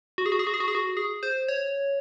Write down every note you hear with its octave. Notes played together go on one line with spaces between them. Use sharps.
F#4
G#4
F#4
G#4
F#4
G#4
F#4
G#4
F#4
G#4
C5
C#5